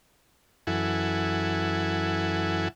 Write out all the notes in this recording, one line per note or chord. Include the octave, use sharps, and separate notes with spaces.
F#2 E3 E4 A4 F#5 G#5